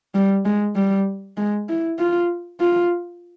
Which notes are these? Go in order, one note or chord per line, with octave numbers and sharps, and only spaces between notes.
G3
G#3
G3
G#3
E4
F4
F4